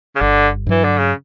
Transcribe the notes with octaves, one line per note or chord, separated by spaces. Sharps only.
C#3
G1 D3
G2 E3 F#3
D3
C#3